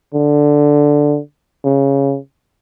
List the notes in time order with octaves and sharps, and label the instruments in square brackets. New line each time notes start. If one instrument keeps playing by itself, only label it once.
[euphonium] D3
C#3